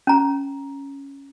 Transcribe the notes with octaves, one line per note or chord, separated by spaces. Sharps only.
C#4 A#5